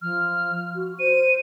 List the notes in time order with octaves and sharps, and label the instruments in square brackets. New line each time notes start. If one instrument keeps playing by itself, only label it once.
[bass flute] F3 [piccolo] F6
[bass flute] F#4
[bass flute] C5 [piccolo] D#7